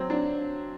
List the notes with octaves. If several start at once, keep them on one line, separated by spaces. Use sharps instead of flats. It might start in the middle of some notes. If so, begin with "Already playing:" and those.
Already playing: F#3 C4
D4